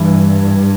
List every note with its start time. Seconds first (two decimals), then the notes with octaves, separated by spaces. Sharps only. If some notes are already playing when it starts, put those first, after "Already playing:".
Already playing: G2 E3